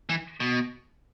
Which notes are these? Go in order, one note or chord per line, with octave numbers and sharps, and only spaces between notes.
E3
B2